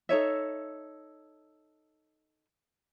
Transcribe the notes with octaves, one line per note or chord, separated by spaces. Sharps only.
D#4 A4 C#5 E5